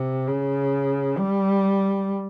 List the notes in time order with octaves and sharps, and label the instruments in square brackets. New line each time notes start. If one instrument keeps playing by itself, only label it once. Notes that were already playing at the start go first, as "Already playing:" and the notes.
Already playing: [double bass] C3
C#3
G3